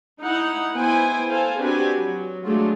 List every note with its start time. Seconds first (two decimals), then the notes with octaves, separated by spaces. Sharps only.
0.20 D#4 E4 F#5
0.75 B3 E4 B4 C5 G5 G#5
1.29 A4 C5 F5 G#5 A5
1.59 C4 D4 F#4 G4 B4 G#5
1.95 F#3
2.44 F#3 G#3 A3 D4 F4